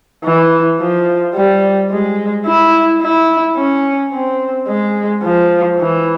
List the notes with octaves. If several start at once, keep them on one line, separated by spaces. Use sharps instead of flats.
E3
F3
G3
G#3
E4
E4
C#4
C4
G#3
F3
E3